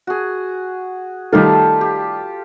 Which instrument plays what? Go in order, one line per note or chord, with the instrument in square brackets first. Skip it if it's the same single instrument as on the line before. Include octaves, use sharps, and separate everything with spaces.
[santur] F#4 G#4
[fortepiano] D#3 G3 A3 [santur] F4 G4 A4
[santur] G4